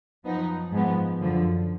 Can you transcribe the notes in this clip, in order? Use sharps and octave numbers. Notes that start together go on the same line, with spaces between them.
F#2 F3 B3 D#4
G#2 F3 B3
F#2 D3 F3